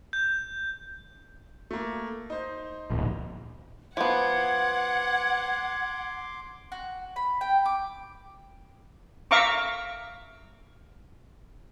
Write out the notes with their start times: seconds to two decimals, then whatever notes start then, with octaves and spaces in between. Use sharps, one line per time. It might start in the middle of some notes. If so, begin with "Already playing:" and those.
0.13 G6
1.71 A3 A#3
2.30 D#4 C5
2.90 D1 A#1
3.97 F3 B3 F#5 C6 D6 G#6
6.72 F#4
7.16 B5
7.41 G5
7.65 D6
9.31 E5 F5 A#5 C#6 D6